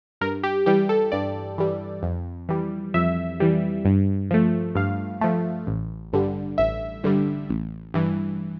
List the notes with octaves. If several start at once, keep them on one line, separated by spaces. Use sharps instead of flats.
G2 A#4
G4
E3 G3 G4
A4
G2 D5
E3 G3
F2
E3 G3
F2 E5
E3 G3
G2
F3 A3
G2 F5
F3 A3
A1
G2 D3 G3
A1 E5
G2 D3 G3
A1
G2 E3